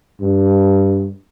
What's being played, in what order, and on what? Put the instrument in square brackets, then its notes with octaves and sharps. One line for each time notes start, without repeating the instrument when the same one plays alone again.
[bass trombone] G2